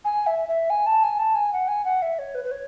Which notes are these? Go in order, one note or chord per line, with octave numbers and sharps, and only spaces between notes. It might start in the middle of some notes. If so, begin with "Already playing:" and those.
G#5
E5
E5
G#5
A5
G#5
A5
G#5
F#5
G#5
F#5
E5
C#5
B4
B4
C#5